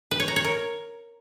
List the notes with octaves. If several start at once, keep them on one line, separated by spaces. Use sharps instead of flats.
B4
C#5
A#5
C#5
A#4